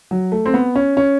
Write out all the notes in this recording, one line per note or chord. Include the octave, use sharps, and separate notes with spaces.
F#3
A3
C4
B3
C#4
C#4